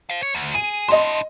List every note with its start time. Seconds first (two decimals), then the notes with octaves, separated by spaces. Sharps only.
0.10 C5 F5
0.22 C#5
0.35 D2
0.55 G#4 D#7
0.88 D4 E4 D#5 C6